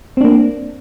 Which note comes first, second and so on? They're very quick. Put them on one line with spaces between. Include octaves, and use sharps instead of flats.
C4 D4 A#3